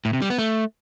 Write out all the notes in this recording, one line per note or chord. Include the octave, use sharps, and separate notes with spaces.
A2
C3
G3
B3
A3